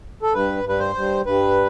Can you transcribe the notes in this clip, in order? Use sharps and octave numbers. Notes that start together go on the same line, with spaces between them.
A4
G2 B4
G2
B4
C5
G2
G2 B4